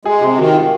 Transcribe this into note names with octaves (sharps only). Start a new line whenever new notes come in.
G#3 G#4
C3 G4
D#3 F#4
F4